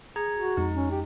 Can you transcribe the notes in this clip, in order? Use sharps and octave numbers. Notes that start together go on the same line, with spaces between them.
G#4 A#5 G#6
F#4
F2 G#3 D#4
C#4
G4